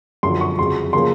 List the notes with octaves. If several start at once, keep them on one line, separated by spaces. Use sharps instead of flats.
F#2 D3 F3 C6
C#6
F2 C#3 F#3 C6
C#3 F3 A#3 C#4 C6